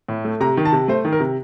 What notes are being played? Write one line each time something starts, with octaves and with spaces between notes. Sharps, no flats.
A2
A3
C3 A#5
D#3
A5
C3
A3 C5
D#3
A#4
C3